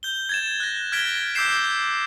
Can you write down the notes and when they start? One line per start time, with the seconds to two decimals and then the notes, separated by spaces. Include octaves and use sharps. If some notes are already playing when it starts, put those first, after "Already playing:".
0.03 G6 G7
0.29 G#6 A6 E7
0.60 F#6 A#6
0.92 F6 G#6 A6 B6 D7 G7
1.35 D6 E6 G6 B6 C7 E7